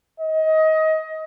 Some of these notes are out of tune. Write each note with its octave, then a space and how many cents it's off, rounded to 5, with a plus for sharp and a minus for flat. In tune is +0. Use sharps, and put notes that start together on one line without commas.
D#5 +25